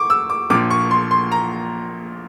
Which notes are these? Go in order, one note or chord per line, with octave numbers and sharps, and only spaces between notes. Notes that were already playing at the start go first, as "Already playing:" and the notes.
Already playing: C#6 D6
E6
D6
A#1 A#2 F3 A#3 D6
C#6
C6
C6
A#5